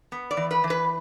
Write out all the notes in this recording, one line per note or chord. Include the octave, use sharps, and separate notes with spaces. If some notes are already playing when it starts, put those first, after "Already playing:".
B3
D5
E3
B4
E3
B4